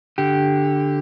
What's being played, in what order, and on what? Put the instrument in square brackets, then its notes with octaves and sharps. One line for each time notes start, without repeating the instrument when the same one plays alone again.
[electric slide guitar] D3 G4